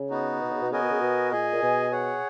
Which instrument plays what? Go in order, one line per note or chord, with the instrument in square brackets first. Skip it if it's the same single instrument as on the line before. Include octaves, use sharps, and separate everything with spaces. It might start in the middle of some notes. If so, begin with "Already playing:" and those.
Already playing: [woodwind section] C#3
[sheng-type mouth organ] B3 D#4 F#4
[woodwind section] B2
C#3
B2
[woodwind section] C#3 [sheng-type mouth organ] B3 F#4 A#4 D#5 G#5
[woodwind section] B2
C#3
B2
[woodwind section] A#2 [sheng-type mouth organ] G#4 D#5 G#5
[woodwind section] A#2
B2
[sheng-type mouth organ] G#4 C#5 F#5